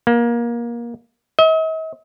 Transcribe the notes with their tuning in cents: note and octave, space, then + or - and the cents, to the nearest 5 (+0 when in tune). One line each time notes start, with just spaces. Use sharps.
A#3 +25
D#5 +45